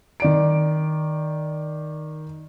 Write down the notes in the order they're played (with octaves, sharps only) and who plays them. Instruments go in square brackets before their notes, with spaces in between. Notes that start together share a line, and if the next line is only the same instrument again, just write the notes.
[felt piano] D#3 D5 D7